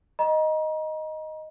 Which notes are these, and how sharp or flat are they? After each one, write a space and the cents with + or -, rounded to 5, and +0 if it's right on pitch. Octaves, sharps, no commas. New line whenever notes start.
D#5 +0 A#5 +35